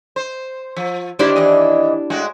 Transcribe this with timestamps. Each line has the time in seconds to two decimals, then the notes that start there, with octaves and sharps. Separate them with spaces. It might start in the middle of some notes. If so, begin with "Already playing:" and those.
0.16 C5
0.76 F3
1.19 D#3 A#3 D4 E4 G4 C5
1.36 D#2 E3 D#5
2.10 A2 G#3 F#4